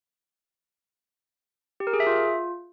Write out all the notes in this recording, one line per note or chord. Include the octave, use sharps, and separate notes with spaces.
G4
A#4
G#4
E5
F4